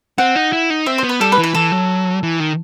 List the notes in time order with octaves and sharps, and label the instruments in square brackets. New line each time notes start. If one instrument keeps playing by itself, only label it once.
[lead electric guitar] C4 [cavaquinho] F#5
[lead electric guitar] D#4
E4
D#4
[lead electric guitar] C4 [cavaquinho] E5
[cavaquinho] C5
[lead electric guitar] B3
[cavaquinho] B4
[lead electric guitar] G3 [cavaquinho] A4
[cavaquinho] B4
[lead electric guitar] E3
[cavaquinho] B4
[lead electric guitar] E3 [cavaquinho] A4
[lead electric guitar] F#3
E3
D#3